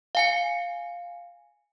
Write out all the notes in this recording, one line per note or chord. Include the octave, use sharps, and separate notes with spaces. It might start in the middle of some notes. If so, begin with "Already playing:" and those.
F5 G#5 C#7